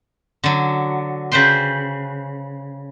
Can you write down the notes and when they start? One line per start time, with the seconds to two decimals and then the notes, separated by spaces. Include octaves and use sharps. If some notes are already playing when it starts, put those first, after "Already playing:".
0.44 D3 F#3
1.32 C#3 B4 C5 G5 C6